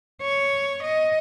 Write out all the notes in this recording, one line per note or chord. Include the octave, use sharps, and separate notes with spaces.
C#5
D#5